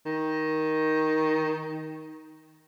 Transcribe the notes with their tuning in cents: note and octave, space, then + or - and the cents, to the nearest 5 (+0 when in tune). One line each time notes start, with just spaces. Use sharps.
D#3 +10